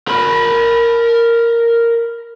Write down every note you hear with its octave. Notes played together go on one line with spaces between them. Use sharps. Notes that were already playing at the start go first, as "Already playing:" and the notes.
A#4 B5